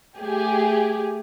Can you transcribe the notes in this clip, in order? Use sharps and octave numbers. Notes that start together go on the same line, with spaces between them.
A3 G4 G#4